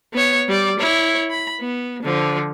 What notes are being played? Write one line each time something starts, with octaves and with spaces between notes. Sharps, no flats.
B3 C#5
G3 D5
E4 C#5
B5
B3
D3 F3